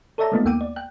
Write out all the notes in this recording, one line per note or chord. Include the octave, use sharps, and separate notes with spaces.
A4 C#5 D5 E5 A5 A#5
G#3 A3 B3 D#4 F4
D#2 A#3 F#5 G5 D6 D#7
D5
G5 F#6